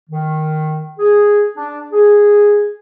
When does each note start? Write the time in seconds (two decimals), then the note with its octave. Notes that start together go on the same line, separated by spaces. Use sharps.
0.10 D#3
0.99 G#4
1.57 D4
1.93 G#4